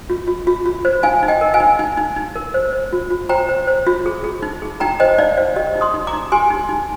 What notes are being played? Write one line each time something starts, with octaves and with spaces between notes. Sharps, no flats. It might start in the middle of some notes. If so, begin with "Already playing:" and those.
F4
F4
F4
F4
C5
D#4 F5 G#5
D#4
D#5 G5
A#4
F5 G#5
D#4
D#4
D#4
D#4
A#4
C5
C5
F4
F4
C5 G5 A#5
C5
C5
F4
G#4
G#4
D#4
G#4
D#4 G5 A#5
C5 D#5 G5
D#4 D5 F5
C5 D5 F5
G4 D#5 G5
D#4
C6 D#6
D#4
A#5 D6
D#4
G4 G#5 C6
D#4
D#4